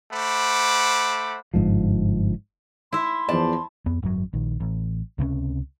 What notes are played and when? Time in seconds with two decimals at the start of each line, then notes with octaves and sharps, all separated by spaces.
0.12 A3 C5 F#5 B5 D6
1.54 G1 C#2 G#2 F3
2.93 E4 E5 C6
3.29 E2 F3 C5 D5 A5
3.86 F2 B3
4.02 G#1 F#2 B2 F#3
4.33 A#1 D#3
4.60 A1
5.18 C#2 C3 G3 C#4